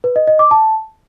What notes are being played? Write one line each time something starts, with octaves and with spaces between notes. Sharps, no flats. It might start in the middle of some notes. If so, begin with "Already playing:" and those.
B4
D#5
D#5
D6
A5